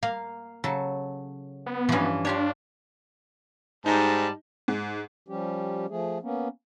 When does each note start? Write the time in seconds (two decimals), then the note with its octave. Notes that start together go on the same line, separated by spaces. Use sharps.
0.03 A#3 F5
0.64 C#3 F#3 A4
1.66 B3
1.89 G2 E3 F3 C#4
2.25 D4 F4 G4 C#5
3.86 G#2 G3 D#4 D#5 A5
4.68 G#2
5.28 F3 G3 C#4 G4
5.89 F3 A3 G#4
6.22 A#3 B3 C#4